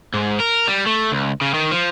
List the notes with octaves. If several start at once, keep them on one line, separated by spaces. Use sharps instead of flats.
G#2
A#4
G3
A3
C#2
C#3
D#3
F3